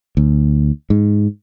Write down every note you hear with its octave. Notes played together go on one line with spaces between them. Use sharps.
D2
G#2